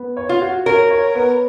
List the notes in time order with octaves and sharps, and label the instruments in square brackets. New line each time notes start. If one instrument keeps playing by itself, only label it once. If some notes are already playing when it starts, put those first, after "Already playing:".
Already playing: [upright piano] B3
C#5
[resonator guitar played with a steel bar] F4
[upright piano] F#4
[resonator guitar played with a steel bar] A#4 [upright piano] C#5
[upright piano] C#5
B3